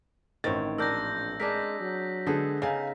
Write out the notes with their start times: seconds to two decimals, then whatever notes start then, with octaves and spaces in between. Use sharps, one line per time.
0.44 A1 D#3 C4 C#5 A6
0.78 A#1 D4 A#4 E6 G6 A#6
1.40 G#3 D4 G#4 A#4 B6
1.81 F#3
2.27 D3 G#3 B3 G#4 A4
2.62 C#3 D#4 F5 G#5